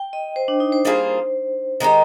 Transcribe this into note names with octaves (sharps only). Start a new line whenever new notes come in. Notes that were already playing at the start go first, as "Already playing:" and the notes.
Already playing: G5
D#5
C5
D4
D#4
C5
G3 A#3 F4 G#4
D#3 G#3 D#4 G4 A#4